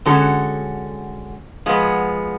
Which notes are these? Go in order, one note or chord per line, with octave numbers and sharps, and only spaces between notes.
D3 G#3 C#4 F#4 A4
F3 G#3 B3